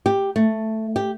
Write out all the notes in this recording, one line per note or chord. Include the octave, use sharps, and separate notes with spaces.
G4
A3
G4